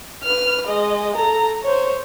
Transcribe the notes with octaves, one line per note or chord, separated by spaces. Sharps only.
B4 F6
G#3 D#5
A4 A#5
C5 C#5